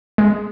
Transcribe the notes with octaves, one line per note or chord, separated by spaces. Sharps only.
G#3